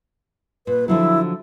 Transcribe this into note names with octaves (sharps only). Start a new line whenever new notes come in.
A#2 B4
D3 F3 F#3 E4